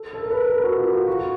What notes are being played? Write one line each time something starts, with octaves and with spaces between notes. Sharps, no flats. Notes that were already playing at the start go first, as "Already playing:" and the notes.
Already playing: A4
A4
A#4
B4
A#4
F#4
F4
F4
F#4